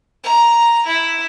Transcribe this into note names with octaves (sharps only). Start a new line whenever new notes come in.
A#5
E4